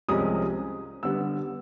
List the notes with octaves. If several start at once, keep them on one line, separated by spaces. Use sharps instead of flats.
C2 C3 F3 G#3 C#4 D#6
D3 G3 B3 E6